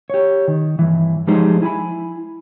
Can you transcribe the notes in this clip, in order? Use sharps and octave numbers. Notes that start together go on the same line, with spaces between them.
G4 C#5
D#3
G2 E3
F3 G3 G#3 D#4 G#4 C5
E4 G#5 A5 B5